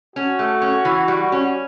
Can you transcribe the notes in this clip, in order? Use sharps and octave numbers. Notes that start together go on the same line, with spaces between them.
C#4 F#4
A3
C#4
E3
G3
C#4